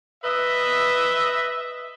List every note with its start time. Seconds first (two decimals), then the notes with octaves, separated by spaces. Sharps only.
0.23 B4 D#5 E5